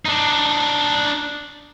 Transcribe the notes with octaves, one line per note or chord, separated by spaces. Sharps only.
D4 D#4